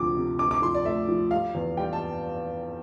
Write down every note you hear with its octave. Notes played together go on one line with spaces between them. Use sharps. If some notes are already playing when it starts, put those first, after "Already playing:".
Already playing: D2 C3 F3 D6
C3
D2 D6
D6
F3 C6
D5
A3 E5
F3
G3 F5
E2
G3 G5
A5